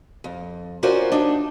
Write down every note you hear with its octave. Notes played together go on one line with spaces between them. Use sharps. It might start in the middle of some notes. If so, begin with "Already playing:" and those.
F2
C#4 F4 F#4 A#4 C5 D5
D4 D#4